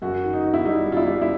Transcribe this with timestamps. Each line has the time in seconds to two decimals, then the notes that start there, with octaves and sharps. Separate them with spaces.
0.02 F#2 F#4
0.24 D#3
0.33 D#4
0.44 D#3
0.54 E4
0.65 G3 D#4
0.86 G3
0.92 F4
0.97 E4
1.08 G3
1.22 E4